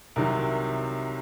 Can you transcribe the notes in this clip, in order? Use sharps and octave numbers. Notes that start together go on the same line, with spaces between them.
C2 C3 D#3 F#3 A#4